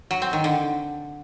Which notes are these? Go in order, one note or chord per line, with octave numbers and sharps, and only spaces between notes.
F#3
C4
D#3
D3